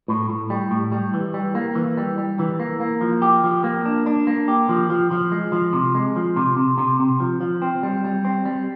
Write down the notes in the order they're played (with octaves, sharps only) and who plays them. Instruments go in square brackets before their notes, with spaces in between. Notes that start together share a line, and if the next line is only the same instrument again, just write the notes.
[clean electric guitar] A2
A2
G3
A2
G3
E3
G3
A#3
E3
G3
G3
E3
A#3
A#3
F3
G4
F3
A#3
D4
D4
A#3
G4
F3
F3
F3
G#3
F3
C3
G#3
F3
C3
C3
C3
C3
F3
F3
C4
G3
G3
C4
G3